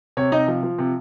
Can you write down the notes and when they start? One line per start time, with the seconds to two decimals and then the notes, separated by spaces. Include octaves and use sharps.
0.17 C3 C#5
0.32 C3 D#4 D#5
0.48 F3
0.63 F3
0.79 C3